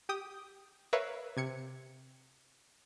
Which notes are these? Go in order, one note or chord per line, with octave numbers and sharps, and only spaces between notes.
G4 G5 D#6
A#4 B4 C#5 E5 F5
C3 G#6 C#7